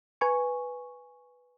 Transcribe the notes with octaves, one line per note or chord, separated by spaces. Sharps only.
B4 G#5 C#6